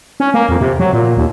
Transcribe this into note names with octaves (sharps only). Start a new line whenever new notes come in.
C#4
A#3
F2
C3
F#3
A#2
D#2